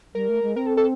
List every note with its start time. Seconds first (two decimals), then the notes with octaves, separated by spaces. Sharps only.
0.15 G3 A#4
0.29 A3
0.42 G#3
0.56 C4 A#4
0.67 A4
0.77 A4